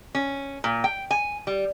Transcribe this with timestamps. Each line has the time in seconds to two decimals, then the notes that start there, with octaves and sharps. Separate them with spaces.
0.15 C#4
0.64 A#2
0.84 G5
1.11 G#5
1.47 G3